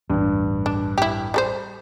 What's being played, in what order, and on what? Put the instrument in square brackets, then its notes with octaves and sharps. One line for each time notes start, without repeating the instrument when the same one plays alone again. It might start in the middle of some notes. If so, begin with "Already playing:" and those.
[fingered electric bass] A1 E2 [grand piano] G2
[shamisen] D4
E4 G4
G3 A4 C5